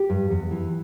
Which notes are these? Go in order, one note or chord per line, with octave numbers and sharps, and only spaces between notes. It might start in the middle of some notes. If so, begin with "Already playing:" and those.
Already playing: G4
G2
E2
E3